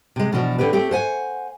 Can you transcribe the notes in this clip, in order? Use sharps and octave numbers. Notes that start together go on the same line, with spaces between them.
C3 G#3
B2 E3 F3 D4 F#4
D3 C4 G4 B4
A3 C4 G4
C5 F#5 G#5